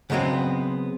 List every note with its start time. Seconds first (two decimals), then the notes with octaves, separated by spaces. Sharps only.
0.10 C#3 F#3 G#3 B3 C4